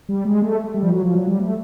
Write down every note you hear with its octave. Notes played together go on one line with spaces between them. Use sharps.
G3
G#3
A3
G3
F3
F#3
F3
F#3
G3
A3